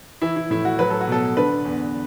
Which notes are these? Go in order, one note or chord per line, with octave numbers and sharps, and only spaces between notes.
E3 E4
E4
A2 E4
F#4
F#3 B4
A4
F#4
B2 A4
D3 B4
E2